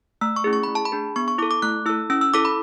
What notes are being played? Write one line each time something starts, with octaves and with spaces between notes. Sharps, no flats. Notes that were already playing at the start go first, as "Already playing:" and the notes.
A3 E6
C#6
C#4 E4 G#4
C#6
A3 B5
A5
B5
D4 G#4
B3 C#6
C#6
E4 A4 D6
D6
A3 F#6
E4 A4 E6
C#4 E6
E6
E4 A4 D6
B5